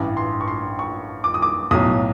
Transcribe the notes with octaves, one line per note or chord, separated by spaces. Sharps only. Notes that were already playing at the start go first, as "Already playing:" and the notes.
Already playing: A1 G2 E3
C6
C#6
C6
C#6
D6
D#6
D6
B1 A2 F#3 D#6